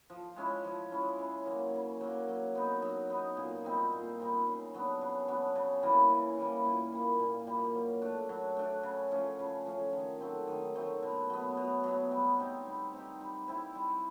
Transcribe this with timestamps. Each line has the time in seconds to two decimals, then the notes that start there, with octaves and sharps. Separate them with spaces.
0.10 F3
0.36 G#3 C#4 E4
0.64 F3
0.91 G#3 C#4 E4
1.18 C#3
1.45 F#3 A#3
1.74 C#3
2.01 F#3 A#3
2.28 F#3
2.55 B3 D#4
2.82 F#3
3.10 B3 D#4
3.37 A#2
3.64 G3 C4 D#4
3.92 A#2
4.20 G3 C4 D#4
4.47 C#3
4.74 F#3 B3 D4
5.01 C#3
5.28 F#3 B3 D4
5.55 C#3
5.83 E3 G3 A#3
6.10 C#3
6.38 E3 G3 A#3
6.65 A#2
6.93 G3 A#3
7.19 A#2
7.47 G3 A#3
7.75 F#3
8.02 A3 D4
8.29 F#3
8.57 A3 D4
8.83 C#3
9.11 F3 A3 C#4
9.39 C#3
9.66 F3 A3 C#4
9.93 D#3
10.21 F#3 A3 C4
10.48 D#3
10.75 F#3 A3 C4
11.03 B2
11.30 F#3 B3
11.57 B2
11.84 F#3 B3
12.11 G3
12.39 C4 D#4 G4
12.67 G3
12.93 C4 D#4 G4
13.21 G3
13.48 C4 E4 G4
13.75 G3